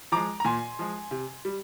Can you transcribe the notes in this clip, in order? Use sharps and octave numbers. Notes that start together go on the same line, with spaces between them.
F3 G#3 A#5 D6
A#5
A#2 G#5 C6
F3 G#3
C3
G3